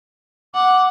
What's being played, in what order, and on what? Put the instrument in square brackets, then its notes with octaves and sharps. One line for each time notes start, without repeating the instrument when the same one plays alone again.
[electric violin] F#5 [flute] D6